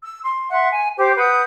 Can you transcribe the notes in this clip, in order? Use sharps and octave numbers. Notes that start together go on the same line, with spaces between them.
E6
C6
E5 F#5 C6
G#5
G4 C5 D6
B4 F#5 D#6 G6